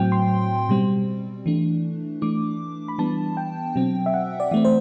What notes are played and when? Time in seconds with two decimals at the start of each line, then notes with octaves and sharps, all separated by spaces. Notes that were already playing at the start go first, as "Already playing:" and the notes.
Already playing: A2 F#3 C4 G5
0.12 C6
0.69 B2 G3 C4
1.46 E3 A3 D4
2.22 E3 A3 D4 D6
2.88 B5
2.98 E3 G3 B3 D4 A5
3.37 G5
3.76 B2 F#3 C4
4.06 E5
4.14 F#5
4.40 D5
4.51 E3 A3 C4 E5
4.65 C5